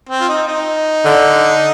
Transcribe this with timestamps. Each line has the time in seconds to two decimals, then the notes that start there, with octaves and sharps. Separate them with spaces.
0.09 C4
0.21 F4
0.28 D#4
0.47 D#4
1.05 D3